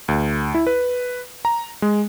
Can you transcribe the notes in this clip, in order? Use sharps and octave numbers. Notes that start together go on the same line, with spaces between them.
D2
E4
B4
A#5
G#3